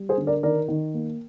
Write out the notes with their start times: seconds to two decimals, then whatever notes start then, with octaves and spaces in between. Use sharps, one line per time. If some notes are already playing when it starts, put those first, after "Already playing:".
Already playing: G3
0.09 G#4 C5
0.18 D3
0.27 A#4 D5
0.43 D#3 A#4 D5
0.68 D#3
0.94 A#3